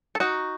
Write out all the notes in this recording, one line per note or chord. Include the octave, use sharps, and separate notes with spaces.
A4
D#4 F#4